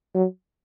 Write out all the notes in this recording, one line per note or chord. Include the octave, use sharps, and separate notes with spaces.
F#3